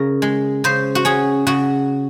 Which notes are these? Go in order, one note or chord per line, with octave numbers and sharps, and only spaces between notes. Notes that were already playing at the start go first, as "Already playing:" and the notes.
Already playing: C#3 A#4
G#3
C#3 C5
F#4
C#4 G#4
C#3 F#4